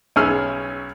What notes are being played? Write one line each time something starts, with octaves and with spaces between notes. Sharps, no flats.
B1 C#4 G#4 E6 F6